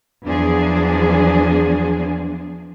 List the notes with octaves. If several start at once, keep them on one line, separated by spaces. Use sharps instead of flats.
E2 F3 F#3 D4 G#4